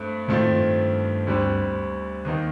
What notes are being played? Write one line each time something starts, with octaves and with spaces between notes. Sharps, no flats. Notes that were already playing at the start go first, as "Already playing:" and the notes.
Already playing: G2 A3 C4
F2 A2 D#3 A3 C4 F4
G2
D2 D3 G3 C4 G4
D#2 D#3 A#3 D#4